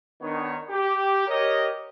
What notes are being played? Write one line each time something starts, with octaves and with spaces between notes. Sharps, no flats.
D#3 B3 D4 C#5
G4
G4 A#4 C#5 D#5